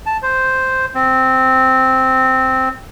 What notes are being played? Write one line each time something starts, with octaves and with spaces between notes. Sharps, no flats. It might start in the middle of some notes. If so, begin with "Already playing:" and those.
A5
C5
C4